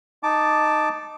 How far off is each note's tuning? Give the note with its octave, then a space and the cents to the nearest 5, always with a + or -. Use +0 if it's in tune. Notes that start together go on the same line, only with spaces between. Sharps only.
D#4 -5 A5 +0 D6 +0